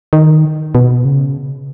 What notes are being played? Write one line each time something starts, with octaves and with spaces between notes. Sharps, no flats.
D#3
B2
C#3